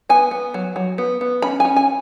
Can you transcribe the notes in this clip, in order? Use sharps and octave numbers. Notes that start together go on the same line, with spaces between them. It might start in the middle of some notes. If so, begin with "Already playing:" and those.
B3 G#5
B3
F#3
F#3
B3
B3
C#4 B5
G#5
C#4
G#5